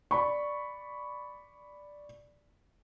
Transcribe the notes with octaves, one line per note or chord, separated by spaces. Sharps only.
D5 B5 C#6